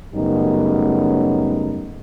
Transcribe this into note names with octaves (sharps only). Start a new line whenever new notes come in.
F#2 C#3 G3 A3 B3 D#4